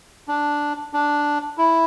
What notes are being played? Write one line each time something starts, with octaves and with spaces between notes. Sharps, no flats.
D4
D4
E4